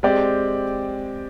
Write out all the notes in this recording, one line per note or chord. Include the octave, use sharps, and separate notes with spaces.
G#3 C4 G4 D5